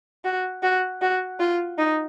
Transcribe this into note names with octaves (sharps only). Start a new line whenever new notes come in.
F#4
F#4
F#4
F4
D#4